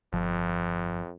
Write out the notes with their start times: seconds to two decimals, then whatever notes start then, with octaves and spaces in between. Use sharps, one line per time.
0.13 G1 F2 F3